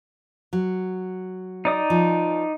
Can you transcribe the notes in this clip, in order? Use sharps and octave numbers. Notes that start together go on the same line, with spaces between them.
F#3
D#4 D5 D#6
F3